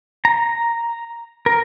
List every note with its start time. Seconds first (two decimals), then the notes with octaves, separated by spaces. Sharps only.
0.25 A#5
1.46 A#4